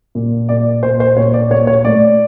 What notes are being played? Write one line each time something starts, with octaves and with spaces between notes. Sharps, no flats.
A#2
A#2 D5
A#2 C5
C5
A#2 C#5
D5
A#2 C#5
C#5
A2 D5